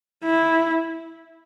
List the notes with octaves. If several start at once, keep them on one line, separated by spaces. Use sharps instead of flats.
E4